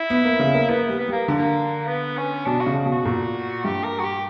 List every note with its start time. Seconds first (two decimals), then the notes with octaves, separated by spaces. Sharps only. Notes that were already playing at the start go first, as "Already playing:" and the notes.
Already playing: E4
0.10 B3
0.25 A#3
0.39 C#3
0.55 A#3
0.69 A#3 B3
0.89 G3
0.99 B3
1.08 G3 A#3
1.28 D3
1.37 A#3
1.87 B3
2.17 C#4
2.46 B2 D4
2.61 F#4
2.66 C#3
2.86 B2
2.91 F#4
3.05 A#2
3.64 G2 G4
3.84 A#4
4.00 F#4
4.04 G4